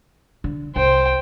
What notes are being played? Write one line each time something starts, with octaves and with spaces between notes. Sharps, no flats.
D3
C2 C5 G5